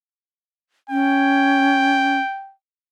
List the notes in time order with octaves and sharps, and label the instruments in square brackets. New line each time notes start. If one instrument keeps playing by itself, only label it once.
[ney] C#4 [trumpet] G5